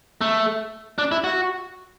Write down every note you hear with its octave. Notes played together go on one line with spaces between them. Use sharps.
A3
D4
E4
F#4